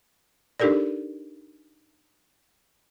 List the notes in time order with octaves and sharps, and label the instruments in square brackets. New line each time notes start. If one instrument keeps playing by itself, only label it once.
[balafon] D4 D#4 G4 A4 A#4 D5